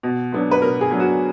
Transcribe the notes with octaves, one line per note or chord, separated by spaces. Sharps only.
B2
F#3 B3 D4
B4
B2 A#4
G#4
F#3 B3 D4
F#4